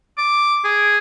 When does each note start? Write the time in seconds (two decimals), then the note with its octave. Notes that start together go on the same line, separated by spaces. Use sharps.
0.18 D6
0.64 G#4